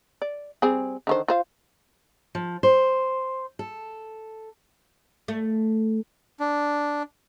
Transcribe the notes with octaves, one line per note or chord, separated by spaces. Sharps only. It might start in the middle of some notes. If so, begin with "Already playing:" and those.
D5
G3 C4 G#4
D3 D#3 C5
F4 C5 F5
F3
C5
A4
A3
D4